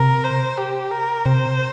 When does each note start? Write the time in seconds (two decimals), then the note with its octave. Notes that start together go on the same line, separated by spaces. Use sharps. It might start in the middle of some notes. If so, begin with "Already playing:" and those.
Already playing: C3 A#4
0.24 C5
0.58 G4
0.91 A#4
1.25 C3 C5